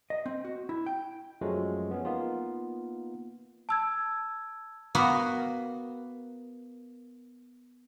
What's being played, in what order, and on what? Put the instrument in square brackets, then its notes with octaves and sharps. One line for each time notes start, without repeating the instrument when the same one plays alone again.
[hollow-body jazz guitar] D#5
C4
F#4
E4
G5
[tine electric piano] F#2 F3 F#3 G#3 A3
B3 C#4
A#3 B3 D#4 F4
[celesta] A5 E6 G#6
[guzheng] A#3 B3 F#4 A#4